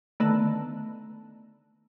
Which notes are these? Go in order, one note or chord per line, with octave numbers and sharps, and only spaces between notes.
D3 D#3 A3 B3